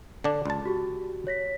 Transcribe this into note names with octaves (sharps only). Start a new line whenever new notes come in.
D3 D4
C#2 A5
F#4 G4
C#5 A#6 B6